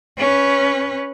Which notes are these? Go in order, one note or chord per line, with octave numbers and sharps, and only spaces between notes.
C#4 B4